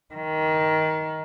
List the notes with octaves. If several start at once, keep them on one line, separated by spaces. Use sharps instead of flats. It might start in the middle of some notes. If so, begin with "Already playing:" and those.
D#3